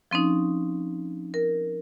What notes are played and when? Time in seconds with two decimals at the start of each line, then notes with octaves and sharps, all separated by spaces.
0.11 F3 C4 C#4 D#4
1.34 A#4